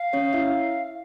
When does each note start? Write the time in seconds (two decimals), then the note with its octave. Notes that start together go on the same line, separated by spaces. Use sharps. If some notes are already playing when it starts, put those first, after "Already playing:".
Already playing: F5
0.13 C#4 C#5
0.33 E4 E5